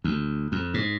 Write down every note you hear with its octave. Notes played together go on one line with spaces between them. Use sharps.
D2
F2
G#2